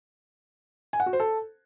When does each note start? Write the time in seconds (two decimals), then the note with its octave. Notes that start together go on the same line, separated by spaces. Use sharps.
0.93 G#5
1.00 F#5
1.06 F#4
1.13 C5
1.20 A4